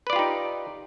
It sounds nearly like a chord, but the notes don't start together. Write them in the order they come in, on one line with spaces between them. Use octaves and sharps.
B4 D5 F4 G4 D#4